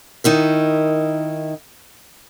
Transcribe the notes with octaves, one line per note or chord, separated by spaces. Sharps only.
D#3 D#4 E4 A#4